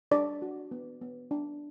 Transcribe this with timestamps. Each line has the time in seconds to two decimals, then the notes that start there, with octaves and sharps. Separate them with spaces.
0.11 D4 D5
0.42 F#4
0.71 B3
1.01 B3
1.31 D4